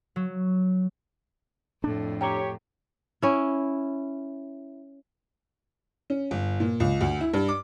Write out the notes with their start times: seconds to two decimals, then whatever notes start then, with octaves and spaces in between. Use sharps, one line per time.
0.16 F#3
1.84 F2 A2 D4
2.21 G4 C#5 G5 A#5
3.22 C#4 E4
6.10 C#4
6.31 G1
6.60 A#2
6.80 C#2
7.01 D2
7.21 E4
7.33 G2
7.48 D6